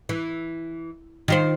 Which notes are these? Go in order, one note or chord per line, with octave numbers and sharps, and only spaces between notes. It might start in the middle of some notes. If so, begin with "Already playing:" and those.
E3
D#3 F4 C5